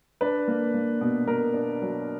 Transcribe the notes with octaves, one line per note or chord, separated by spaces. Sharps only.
D4 B4
A#3
A#3
B2
B2 A#4
D4
F#3